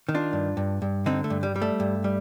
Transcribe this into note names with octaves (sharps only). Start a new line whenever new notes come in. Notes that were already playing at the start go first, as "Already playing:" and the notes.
D#3
D4 F4
G2
G2
G2
D3 C4 D#4
A3
G2
G3
G3
A3
G2
G3